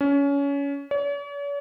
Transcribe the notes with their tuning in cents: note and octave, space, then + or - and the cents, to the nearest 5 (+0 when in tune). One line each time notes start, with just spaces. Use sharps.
C#4 +25
C#5 +45